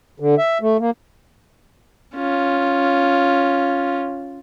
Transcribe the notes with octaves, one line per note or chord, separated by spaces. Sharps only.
D3
E5
A3
A#3
C#4 F4